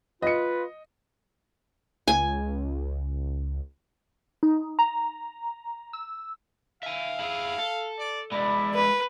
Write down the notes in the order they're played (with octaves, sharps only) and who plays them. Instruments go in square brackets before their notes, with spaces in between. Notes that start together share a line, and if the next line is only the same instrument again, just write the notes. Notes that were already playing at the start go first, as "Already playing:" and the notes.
[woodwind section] F4 [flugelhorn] B4 [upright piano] D#5 C#7
[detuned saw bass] C#2 [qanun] G#5
[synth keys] D#4
A#5
E6
[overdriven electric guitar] E5 G#5 [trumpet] F5
[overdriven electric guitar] E4 G#4
A4
[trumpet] D5
[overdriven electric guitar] G#3 B3 [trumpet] E4 [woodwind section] D5 B5
[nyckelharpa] B4